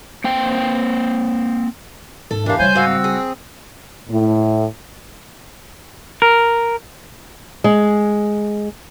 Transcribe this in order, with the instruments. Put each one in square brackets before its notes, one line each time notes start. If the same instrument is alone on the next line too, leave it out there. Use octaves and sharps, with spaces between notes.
[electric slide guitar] A#3 C4 G5
[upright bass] G#2 [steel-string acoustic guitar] A4
[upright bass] E2 [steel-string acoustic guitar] E3 F5 [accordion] D4 [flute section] G4 A#4
[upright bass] C#3 G3 [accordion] C5 G#5 G6 [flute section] C#5
[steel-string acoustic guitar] G#2 F5 [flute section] F#4 E6
[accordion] C4
[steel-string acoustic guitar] G#4
[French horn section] A2
[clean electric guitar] A#4
[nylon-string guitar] G#3